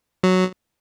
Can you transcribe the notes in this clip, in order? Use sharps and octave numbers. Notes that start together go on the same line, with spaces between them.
F#3